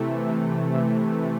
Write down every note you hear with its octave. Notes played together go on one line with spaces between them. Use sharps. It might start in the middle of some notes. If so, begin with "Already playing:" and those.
Already playing: C3 E3 A3
C3
C3
E3